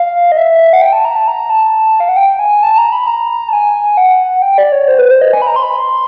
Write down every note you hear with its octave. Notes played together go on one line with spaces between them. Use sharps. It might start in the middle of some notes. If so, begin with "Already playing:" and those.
Already playing: F5
D#5
E5
F#5
G5
A5
A#5
A5
A#5
A5
F5
F#5
G5
G#5
A5
A#5
B5
A#5
A5
G#5
F#5
G5
D5
C#5
C5
B4
C5
D#5
G#5
B5
A#5
C6
B5
C6